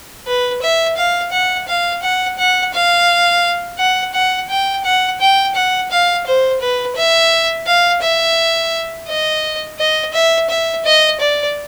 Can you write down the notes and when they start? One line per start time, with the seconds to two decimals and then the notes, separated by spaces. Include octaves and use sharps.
0.26 B4
0.62 E5
0.97 F5
1.32 F#5
1.68 F5
2.02 F#5
2.38 F#5
2.74 F5
3.78 F#5
4.14 F#5
4.50 G5
4.84 F#5
5.21 G5
5.55 F#5
5.91 F5
6.26 C5
6.60 B4
6.96 E5
7.66 F5
8.02 E5
9.08 D#5
9.79 D#5
10.13 E5
10.49 E5
10.85 D#5
11.20 D5